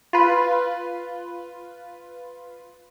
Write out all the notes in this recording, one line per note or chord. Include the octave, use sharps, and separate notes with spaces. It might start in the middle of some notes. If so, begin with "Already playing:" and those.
F4 B4